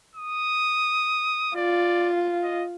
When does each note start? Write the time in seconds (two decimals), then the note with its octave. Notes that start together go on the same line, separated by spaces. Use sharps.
0.16 D#6
1.56 F4 D5
2.43 D#5